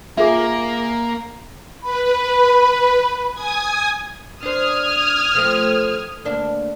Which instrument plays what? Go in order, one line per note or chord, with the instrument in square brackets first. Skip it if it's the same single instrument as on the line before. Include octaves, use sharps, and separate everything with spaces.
[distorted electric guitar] A#3 [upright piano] F4 G#4 [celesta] E5 D6
[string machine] B4 [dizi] B5
[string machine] G#5 D#6 G#6
[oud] D4 C5 [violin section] D#6 F6 G#6
[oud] F3 A3 C4
D2 A#3 D4